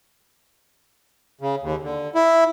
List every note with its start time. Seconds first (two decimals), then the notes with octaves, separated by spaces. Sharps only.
1.41 C#3
1.62 D#2
1.83 D3
2.15 E4